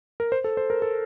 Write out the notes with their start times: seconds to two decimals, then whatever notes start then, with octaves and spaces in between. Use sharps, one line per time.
0.20 A#4
0.32 C5
0.44 A4
0.57 C5
0.70 A#4
0.82 A4